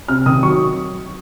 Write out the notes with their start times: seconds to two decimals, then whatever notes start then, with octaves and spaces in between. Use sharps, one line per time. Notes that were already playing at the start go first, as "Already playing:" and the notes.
0.08 C3 F6
0.26 D#3 D#6
0.43 F#3 C#6